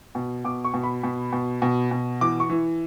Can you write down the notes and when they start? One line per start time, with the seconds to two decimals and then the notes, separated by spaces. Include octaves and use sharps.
0.15 B2
0.45 B2 D6
0.64 C#6
0.74 B2
0.83 B5
1.03 B2
1.33 B2
1.62 B2
1.91 B2
2.21 E3 D6
2.40 C#6
2.50 E3